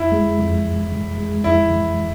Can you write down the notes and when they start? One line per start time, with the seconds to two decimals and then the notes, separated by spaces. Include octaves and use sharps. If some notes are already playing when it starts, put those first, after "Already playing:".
Already playing: F2 E4
0.12 G#3
0.39 F2
0.66 E3
0.92 F2
1.18 G#3
1.44 F2 E4
1.70 E3